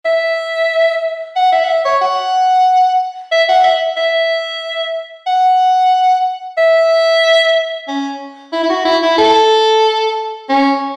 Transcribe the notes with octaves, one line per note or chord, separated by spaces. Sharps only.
E5
F#5
E5
F#5
E5
C#5
F#5
E5
F#5
E5
E5
F#5
E5
C#4
E4
E4
F#4
E4
E4
A4
C#4